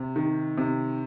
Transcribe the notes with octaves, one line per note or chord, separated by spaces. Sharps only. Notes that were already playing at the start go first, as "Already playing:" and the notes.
Already playing: C3
D#3
C3